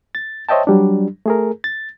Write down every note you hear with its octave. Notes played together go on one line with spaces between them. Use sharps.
A6
C5 C#5 D#5 E5 G5 A5
F#3 G3 D4
A3 G#4 A#4
A6